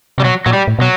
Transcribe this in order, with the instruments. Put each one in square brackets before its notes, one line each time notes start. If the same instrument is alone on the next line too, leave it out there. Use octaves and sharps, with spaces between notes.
[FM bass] C3 [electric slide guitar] G3
[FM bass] B2 [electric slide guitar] F#3
[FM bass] A#2 [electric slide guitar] F#3
[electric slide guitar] G3
[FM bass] A2
[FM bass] B2 [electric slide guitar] F#3